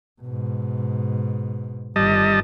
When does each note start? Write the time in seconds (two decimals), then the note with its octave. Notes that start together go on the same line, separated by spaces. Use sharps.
0.22 G#2 B2
1.96 G1 D#3 G3 D#5 A5